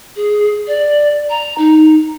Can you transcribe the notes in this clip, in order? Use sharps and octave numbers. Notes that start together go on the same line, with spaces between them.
G#4
D5
A#5
D#4